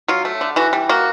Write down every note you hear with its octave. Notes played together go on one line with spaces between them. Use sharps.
F#3 F4
A3
D3
E3 F#4
G3
A#3 F#4